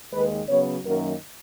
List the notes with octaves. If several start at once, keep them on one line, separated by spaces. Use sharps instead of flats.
D#2 D#3 G#3 B4
C#3 F#3 B3 C#5
F#2 D#3 F#3 A#3 A#4